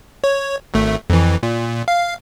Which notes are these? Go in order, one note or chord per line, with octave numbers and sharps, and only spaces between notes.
C#5
G#1 A3
F2 E3
A#2
F5